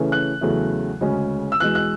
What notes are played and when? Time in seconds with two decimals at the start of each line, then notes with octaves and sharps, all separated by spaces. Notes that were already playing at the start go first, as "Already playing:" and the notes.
Already playing: C#3 E3 A3 C#4
0.12 F#6
0.41 E2 C#3 F#3 A3
1.01 D2 C#3 G#3 C#4
1.52 E6
1.60 E2 B2 G#3 F#6
1.75 F#6